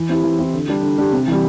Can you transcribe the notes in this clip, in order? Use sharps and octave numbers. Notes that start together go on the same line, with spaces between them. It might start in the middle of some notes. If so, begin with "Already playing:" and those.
Already playing: E3
C4 E4 G4
E3
C4 E4 G4
D3
G3 D4 G4
D3
G3 D4 G4
C3
E3 G3